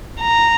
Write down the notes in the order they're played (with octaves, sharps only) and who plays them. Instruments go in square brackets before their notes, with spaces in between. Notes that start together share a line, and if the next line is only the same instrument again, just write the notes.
[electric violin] A#5